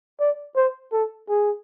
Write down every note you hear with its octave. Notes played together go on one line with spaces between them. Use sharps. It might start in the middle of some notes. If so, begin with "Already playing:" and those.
D5
C5
A4
G#4